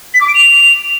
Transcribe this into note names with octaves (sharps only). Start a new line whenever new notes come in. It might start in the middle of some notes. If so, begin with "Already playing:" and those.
B6
D6
D7
F7